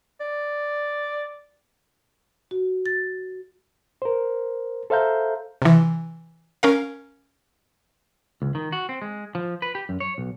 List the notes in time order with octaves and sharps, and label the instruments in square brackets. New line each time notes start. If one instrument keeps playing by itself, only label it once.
[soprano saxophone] D5
[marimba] F#4
A6
[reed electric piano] A#4 C5
A4 C5 E5 F5 A#5 G6
[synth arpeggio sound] C3 E3
C#4 A#4 F5
[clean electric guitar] C#2
D#3
F#4
C4
G#3
F3
B4
G4
F#2
C#5
B1